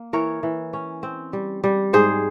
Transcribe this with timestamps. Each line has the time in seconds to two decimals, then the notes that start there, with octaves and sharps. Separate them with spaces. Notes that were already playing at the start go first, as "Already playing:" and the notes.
Already playing: A#3
0.13 E3 A#4 C#5
0.43 E3
0.73 C#4
1.03 C4
1.33 G3
1.64 G3
1.93 G#2 G#4 C5